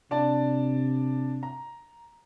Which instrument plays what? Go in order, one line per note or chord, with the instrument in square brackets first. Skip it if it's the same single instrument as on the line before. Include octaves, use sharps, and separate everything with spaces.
[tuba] C3 [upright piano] D4 D5 A5
[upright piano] A#5